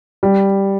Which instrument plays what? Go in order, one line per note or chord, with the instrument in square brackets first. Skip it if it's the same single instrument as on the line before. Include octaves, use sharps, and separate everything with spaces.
[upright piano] G3